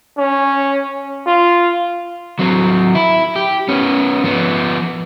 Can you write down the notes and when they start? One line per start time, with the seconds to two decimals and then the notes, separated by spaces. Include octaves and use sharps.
0.18 C#4
1.27 F4
2.39 F#3 C4
2.95 E4
3.36 G4
3.68 B3 C#4
4.24 F3 B3